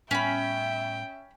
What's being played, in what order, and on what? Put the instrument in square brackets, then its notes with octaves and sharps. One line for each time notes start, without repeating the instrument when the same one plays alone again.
[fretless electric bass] A2 G3 B3 [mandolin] C#4 B5 [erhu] E5 [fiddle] G5